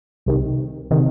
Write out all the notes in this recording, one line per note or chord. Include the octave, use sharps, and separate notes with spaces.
C2 C3 D#3
C3 D#3